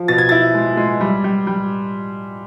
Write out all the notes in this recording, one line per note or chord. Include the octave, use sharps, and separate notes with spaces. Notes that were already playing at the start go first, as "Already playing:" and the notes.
Already playing: F3
B2 A6
G#6
E4 A6
G#3
G#3
G3
G3
G3